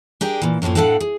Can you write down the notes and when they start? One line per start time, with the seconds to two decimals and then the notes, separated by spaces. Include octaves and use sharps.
0.21 D4 G4 G#4 A#4
0.42 A#2 E3
0.62 F#2 A2 F3 A#3 C#4
0.75 A2 C#4 D4 A4 F5 F#5
1.00 G#4